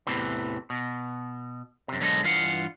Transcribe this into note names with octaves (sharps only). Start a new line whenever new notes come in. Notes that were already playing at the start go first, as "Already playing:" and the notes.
E2 A2 C3 E3
B2
F#2 C3
B2 D3 F#3 G#3 A4 D#5
G2 E3 F4 F5 F#5